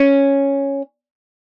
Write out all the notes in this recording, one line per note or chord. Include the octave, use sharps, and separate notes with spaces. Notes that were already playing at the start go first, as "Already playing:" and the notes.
Already playing: C#4